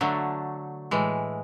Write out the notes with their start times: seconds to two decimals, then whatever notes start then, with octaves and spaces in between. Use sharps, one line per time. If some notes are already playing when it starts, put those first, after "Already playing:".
0.01 D3 F#3 A3
0.91 A2 E3 G#3